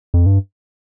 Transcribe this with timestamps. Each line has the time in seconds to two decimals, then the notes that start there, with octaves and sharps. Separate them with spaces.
0.14 F2
0.26 G2